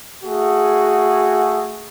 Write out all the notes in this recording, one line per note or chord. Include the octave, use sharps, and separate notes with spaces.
A3 F#4 G#4